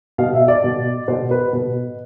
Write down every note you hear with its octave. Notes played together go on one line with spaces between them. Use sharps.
B2 F5
E5
D5
B2
B2 C5
B4
B2 B4